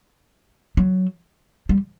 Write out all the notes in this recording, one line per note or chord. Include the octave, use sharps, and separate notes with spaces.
F#3
G3